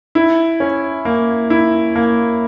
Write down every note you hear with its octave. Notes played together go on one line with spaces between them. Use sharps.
E4
C#4
A#3
E4
A#3